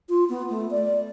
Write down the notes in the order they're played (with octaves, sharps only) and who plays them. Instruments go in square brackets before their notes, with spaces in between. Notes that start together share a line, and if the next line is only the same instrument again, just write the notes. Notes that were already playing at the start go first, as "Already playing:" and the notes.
[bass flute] F4
B3
A3
D5